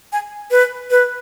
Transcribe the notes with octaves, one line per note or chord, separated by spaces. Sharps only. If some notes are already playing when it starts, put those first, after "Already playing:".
G#5
B4
B4